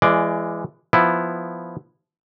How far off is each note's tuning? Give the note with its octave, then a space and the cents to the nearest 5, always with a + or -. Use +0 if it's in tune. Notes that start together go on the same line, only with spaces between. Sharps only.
E3 +30 G#3 +0 D5 +0
F3 +0 B3 +0 E4 +0